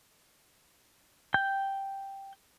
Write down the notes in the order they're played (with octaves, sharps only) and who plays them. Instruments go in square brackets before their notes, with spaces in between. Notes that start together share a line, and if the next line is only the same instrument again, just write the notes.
[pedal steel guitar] G5 G6